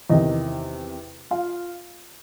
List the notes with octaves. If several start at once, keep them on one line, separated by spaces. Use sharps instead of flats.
E2 C3 D#3 D#4 D#5
F4 F5